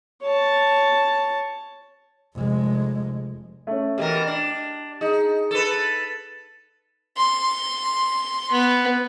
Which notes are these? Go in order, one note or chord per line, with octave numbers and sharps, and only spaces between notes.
C#5 A5
F1 G#3
A3 C#4
B2 E3 G4 A#4
D4
D#4 G#4
A4 B4
C6
B3